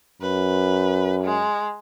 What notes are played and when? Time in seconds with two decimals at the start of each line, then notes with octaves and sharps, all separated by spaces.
0.22 F#2 B4
1.24 G#3